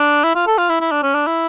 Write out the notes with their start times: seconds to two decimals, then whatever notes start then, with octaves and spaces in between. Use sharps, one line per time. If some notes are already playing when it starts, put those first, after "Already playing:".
Already playing: D4
0.24 E4
0.35 F4
0.47 A4
0.58 F4
0.70 E4
0.81 E4
0.92 D4
1.03 C#4
1.14 D4
1.27 E4